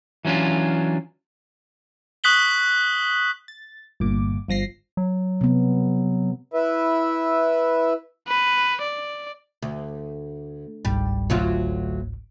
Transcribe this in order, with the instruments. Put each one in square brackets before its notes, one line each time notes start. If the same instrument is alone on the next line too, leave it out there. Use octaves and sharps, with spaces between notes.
[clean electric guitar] E3 F#3 C#4 D4 F4
[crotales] C#6 D#6 F#6 B6 F#7 G7
[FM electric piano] A6
G1 A#2 D6
G1 F3 A#6 C7
[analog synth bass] F#3
[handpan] C3 B3
[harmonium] E4 B4 E5
[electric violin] B4
D5
[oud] D2
[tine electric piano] G1 C#2 G#2 [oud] G3
[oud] D2 F#3 F4